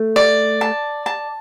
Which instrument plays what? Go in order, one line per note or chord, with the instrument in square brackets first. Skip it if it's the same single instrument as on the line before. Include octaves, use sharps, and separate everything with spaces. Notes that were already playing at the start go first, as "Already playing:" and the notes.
Already playing: [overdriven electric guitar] A3
[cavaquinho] D5
A5
A5